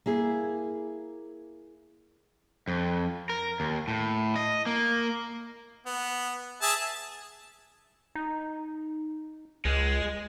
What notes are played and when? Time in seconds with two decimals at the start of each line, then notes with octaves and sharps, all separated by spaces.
0.06 A#3 E4 G#4
2.68 F2
3.29 A#4
3.60 D#2
3.88 A2
4.36 D#5
4.66 A#3
5.86 B3
6.62 G#4 E5 A5
8.15 D#4
9.65 C#2 G#3